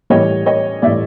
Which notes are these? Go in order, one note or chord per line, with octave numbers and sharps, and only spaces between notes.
A2 E3 G3 C#5 D#5
C#5 D#5
A2 E3 G3 D5 E5